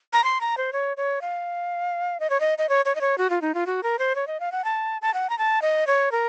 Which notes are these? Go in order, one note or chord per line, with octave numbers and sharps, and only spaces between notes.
A#5
C6
A#5
C5
C#5
C#5
F5
D#5
C#5
D#5
D#5
C#5
C#5
D#5
C#5
F#4
F4
D#4
F4
F#4
A#4
C5
C#5
D#5
F5
F#5
A5
A5
F#5
A#5
A5
D#5
C#5
A#4